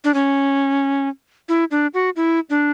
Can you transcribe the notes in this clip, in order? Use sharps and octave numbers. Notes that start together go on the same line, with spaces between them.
D4
C#4
E4
D4
F#4
E4
D4